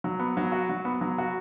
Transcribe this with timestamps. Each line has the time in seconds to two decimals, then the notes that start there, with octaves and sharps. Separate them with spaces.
0.04 F#3
0.19 B3
0.37 F#3
0.52 F#4
0.70 F#3
0.85 B3
1.01 F#3
1.18 F#4